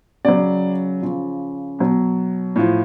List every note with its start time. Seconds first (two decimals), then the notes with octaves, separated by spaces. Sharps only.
0.25 C#3 F#3 D5
1.02 C#3 F3
1.79 B2 F#3
2.56 A2 F3